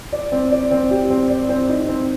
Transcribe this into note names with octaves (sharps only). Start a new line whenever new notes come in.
D5
C4
D5
C4
G4
C4
D5
C4
D#4
C4